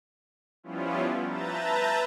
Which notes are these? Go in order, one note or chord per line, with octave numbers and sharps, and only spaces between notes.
F3 G3 B3 C#4 E4 F4
B4 E5 A5 A#5 G6 A6